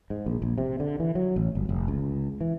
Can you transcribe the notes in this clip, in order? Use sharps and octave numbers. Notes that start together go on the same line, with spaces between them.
G#2
A#1
A#1
C3
D3
E3
F#3
A1
G1
F1
C#2
E3